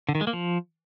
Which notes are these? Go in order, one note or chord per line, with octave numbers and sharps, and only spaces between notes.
D3
D#3
G#3
A#3
F3